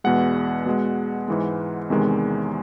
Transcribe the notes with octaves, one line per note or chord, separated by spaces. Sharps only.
E2 B2 G#3 F#5
B2 G#3
G#2 E3 G#3
E2 C3 D#3 G#3